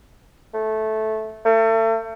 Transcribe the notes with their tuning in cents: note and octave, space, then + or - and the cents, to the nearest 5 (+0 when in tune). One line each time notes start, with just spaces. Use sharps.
A3 -10
A3 +35